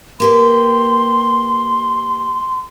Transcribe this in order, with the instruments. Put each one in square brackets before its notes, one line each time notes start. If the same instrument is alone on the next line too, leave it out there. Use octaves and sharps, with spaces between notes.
[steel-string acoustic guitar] A#3 G4 B4 [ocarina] C6